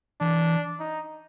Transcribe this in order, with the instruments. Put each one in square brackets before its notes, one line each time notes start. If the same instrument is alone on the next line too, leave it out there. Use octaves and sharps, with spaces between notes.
[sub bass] E3 [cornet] D4
[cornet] D#4